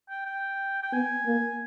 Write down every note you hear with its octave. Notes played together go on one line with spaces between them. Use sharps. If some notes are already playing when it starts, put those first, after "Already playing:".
G5
G5
G5
B3 G#5
A#3